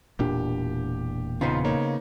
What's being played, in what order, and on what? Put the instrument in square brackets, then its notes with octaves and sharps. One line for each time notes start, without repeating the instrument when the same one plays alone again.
[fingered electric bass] E1 A#2 D4 [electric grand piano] G4
[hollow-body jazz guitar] C#3 B3 C5 [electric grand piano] D#4 F4
[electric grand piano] A#3 D#4 C#5